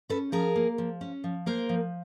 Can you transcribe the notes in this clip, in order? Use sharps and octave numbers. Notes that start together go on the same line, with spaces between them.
C#4 A4 B4
F3 G#4 A#4
A#3
F3
C#4
F3
A#3 A#4 C5
F3